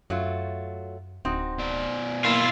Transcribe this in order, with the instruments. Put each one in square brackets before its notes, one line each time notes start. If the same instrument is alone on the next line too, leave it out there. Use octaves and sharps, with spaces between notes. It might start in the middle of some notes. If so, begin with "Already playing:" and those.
[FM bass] F#2 [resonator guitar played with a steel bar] F#3 A3 F4
[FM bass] D1 [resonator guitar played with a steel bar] C4 D#4 F#4
[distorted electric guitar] B2 D5
[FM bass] A#3 [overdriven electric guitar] E4 F4